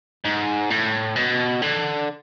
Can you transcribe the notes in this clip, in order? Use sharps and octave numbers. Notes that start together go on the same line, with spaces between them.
G#2
A2
B2
D3